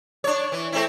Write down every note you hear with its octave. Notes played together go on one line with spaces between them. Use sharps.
D4 C#5
E3
A3 C4 E4